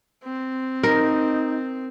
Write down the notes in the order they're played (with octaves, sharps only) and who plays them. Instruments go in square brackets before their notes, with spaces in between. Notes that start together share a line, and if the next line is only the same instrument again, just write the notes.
[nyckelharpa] C4
[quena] D#4 [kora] A#4